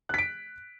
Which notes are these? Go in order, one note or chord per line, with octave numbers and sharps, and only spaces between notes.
F#6 B6 D7